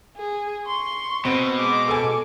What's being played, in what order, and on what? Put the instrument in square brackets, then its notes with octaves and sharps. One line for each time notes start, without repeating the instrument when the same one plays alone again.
[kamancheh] G#4
C6 C#6
[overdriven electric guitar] B2 [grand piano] B3 C4
[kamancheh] G#3 D6
[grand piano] A4 G#5